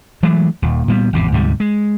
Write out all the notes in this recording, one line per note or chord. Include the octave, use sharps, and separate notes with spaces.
E3 F#3 G#3 A3
D#1 D#2
A#2 G3 B3
G#1 E2 C3
D2 G#2 C3 G3
G#3